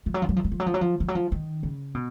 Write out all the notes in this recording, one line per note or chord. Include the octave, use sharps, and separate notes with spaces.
F3
F#3
F3
F#3
F3
F#3
F3
F#3
F3
F#3
F3
F3
F#3
F3
D#3
C#3
B2